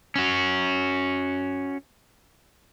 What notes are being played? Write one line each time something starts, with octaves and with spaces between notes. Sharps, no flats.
C#4 F#4